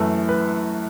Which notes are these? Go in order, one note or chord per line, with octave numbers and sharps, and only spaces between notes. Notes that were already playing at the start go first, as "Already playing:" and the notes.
Already playing: F#2 E3 A3 A4
B4